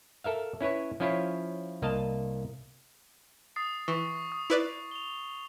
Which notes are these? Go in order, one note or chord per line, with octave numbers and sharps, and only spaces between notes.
A4 A#4 E5 F5
C#4 E4 B4 C#5
F3 C#4 E4 F4 C#5
C2 A#3 D#5 F5 A5
D#6 A6 C7
E3 C#6
D#6
E4 B4 D5
F7 G7